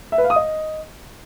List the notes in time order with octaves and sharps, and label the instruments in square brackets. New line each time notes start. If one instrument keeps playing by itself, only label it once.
[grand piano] E5
B4
F5
D#6
D#5